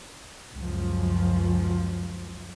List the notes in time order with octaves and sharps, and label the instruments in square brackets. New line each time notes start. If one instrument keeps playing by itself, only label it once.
[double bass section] C#2 F#2 F3